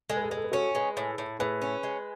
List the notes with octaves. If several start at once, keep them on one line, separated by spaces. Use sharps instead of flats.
G#3 A4
B4
A4
G#3 B4
A4
B4
C#4 F#4 A4
G#3 G#4 B4
A2
A2
A2 G#4 B4
C#4
G#3